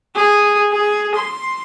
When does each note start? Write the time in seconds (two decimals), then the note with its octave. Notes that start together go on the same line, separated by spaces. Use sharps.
0.15 G#4
0.72 G#4
1.15 C6